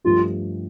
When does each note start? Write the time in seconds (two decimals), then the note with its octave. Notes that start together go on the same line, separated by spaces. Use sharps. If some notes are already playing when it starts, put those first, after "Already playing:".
0.04 G2 F3 A3 D4 F4 G4